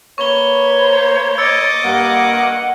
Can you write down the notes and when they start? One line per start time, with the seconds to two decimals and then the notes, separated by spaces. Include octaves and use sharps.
0.18 A#3 B4 C#5 C#6 G7
0.79 C5
1.38 D#5 D6 E6 G#6 A6 C#7
1.84 G2 A#3 F#5